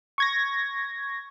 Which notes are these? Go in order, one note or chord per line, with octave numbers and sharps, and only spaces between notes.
C#6 G#6 A#6